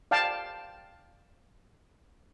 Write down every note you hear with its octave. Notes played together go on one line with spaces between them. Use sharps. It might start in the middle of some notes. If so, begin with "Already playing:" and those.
D5 F5 G5 A5